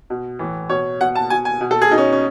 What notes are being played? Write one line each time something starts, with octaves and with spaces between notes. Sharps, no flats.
B2
A2 E3
B2 C#5
B2 F#5
A5
B2 G#5
G#5
B2
A4
G#4
B2 D#4
C#4
C#4